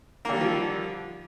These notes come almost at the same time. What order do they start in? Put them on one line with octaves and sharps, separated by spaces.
A#3 D3 G3 D#3 F3